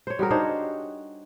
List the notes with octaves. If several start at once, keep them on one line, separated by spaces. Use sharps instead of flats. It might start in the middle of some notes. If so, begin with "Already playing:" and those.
C5 C#5
G3 F#4 G#4 A#4
D4 D#4 C5 C#5